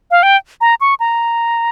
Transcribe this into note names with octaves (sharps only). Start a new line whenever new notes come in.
F5
G5
A#5
C#6
A#5